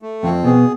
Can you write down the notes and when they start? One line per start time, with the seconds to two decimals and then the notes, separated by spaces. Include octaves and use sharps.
0.02 A3
0.23 F2 F3 C4
0.44 B2 B3 G#4